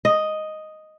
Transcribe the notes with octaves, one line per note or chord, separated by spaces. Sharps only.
D#5